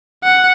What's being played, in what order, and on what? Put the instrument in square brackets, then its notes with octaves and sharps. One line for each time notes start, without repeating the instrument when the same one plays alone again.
[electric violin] F#5